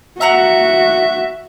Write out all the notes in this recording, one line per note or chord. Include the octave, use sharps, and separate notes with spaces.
F#4 E5 F#5 A#5 E6